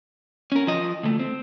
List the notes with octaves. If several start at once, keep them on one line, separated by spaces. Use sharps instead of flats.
C#4 A#4
F3 D#5
D2 A3
C4